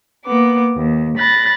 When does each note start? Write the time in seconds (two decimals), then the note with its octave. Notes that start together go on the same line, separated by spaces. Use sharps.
0.24 A#3 B3 D6
0.74 D#2
1.17 B5 F#6 A6 A#6